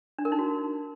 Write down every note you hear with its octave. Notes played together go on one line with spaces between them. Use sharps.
D4
A#4
D#4
F#4